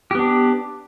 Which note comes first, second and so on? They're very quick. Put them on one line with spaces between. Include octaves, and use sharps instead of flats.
G4 B3 D4